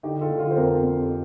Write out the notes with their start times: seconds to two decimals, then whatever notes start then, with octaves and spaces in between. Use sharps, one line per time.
0.03 D3 D#4 G4
0.21 F4 A4
0.30 D3
0.39 F4 A4
0.51 C5
0.56 F2 G4 A#4
0.83 F2